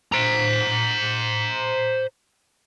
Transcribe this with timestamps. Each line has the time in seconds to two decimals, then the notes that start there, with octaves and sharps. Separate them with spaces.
0.12 C5 A#5